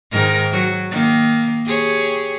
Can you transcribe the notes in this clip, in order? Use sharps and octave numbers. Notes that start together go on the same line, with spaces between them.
G#2 D#3 A#4
F#3 F#4
D#3 A#3
G4 G#4 C#5